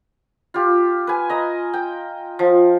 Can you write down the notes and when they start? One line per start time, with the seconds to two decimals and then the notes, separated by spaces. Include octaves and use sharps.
0.54 F4 G4
1.07 B4 G#5
1.29 D#5 A#5
1.73 G5
2.39 F3